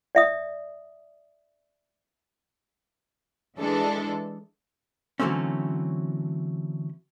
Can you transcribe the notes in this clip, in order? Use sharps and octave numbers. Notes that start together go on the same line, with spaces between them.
D5 E5 D#6
E3 G#3 D4 A4
D3 E3 F#3 A3 C4 C#4